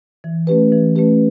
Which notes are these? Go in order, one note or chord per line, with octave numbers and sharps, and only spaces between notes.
E3
A3 C#4 G4 B4
E3
A3 C#4 G4 B4